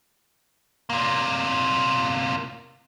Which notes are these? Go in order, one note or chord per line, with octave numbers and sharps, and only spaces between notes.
C3 A#3